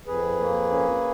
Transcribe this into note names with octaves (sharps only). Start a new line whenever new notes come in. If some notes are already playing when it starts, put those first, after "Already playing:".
F2 G#4 B4
A#3
C#4